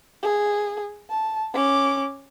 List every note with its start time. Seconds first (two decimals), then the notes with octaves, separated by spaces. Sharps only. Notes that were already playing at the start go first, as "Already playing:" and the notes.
0.23 G#4
1.10 A5
1.54 C#4 D6